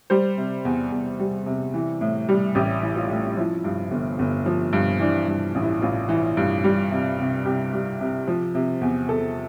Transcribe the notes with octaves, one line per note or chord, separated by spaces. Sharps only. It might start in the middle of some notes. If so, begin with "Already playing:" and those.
G3 C5
C3
E2
E2
G3
C3
E3
A2
G3
A1 G4
E3
F4
A2
F3 E4
G2
G1
G1
F3
G2
E3 D4
G2
A1
E4
A1 F4
E3
G2
G3
C3
C2
C2 G4
G3
C3
F3
C3
E2
E2 A4